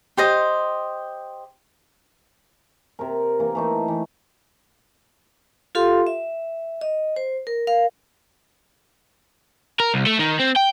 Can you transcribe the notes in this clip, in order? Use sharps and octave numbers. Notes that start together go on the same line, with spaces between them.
G4 C5 D#5
C3 A#4
E3 A#3
E3 A3 D#4
E3
F4 G4 A4 F5 C6
E5
D#5
C5
A#4
A#4 F5
A#4
C2
A3
D#3
C4
G5